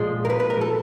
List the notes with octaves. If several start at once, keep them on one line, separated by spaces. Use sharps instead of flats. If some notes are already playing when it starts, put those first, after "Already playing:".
Already playing: A#2 F3 G#3
A#4
B4
B4
A#4
A4